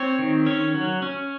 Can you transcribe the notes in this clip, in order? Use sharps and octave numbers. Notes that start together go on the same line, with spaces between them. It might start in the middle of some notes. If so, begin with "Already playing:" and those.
Already playing: C4 C#5
D#3
C#4 C#5
F#3
C#4